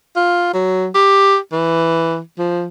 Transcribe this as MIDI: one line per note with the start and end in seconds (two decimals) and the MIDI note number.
0.16 0.53 65
0.53 0.87 54
0.95 1.37 67
1.52 2.19 52
2.38 2.66 53